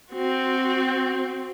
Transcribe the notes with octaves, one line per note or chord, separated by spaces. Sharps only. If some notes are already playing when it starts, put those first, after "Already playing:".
C4 F#4